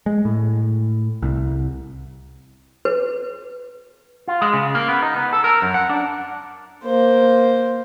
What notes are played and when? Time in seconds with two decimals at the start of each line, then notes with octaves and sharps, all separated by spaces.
0.06 G#3
0.25 A2
1.22 C2
2.85 B4
4.28 F4
4.42 G#3
4.54 C#3
4.75 A#3
4.89 B3
5.02 D#4
5.16 B3
5.33 A4
5.44 A#4
5.62 F#2
5.74 F#5
5.89 D4
6.85 A#3 C5